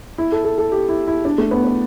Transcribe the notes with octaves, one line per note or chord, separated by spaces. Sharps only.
E4
A4
A4
A4
G4
E4
E4
D4
A3
B3
B4